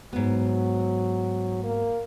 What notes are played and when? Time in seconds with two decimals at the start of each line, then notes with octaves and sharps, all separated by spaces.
0.13 G#2 F#3 B3
1.63 A#3